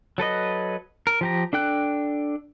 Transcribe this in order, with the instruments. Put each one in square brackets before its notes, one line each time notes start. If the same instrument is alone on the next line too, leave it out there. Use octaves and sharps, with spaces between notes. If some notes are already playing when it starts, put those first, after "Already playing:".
[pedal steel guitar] F#3 A4 B4 D#5
A#4
F3 G4 A#5
D4 A4 G5 F#6